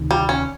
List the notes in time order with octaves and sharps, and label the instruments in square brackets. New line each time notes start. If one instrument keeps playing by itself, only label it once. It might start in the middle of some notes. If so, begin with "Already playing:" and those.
Already playing: [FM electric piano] D2 C3 D#3
[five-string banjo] G3
C#4